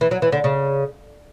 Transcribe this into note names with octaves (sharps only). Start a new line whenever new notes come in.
E3
F#3
E3
D3
C#3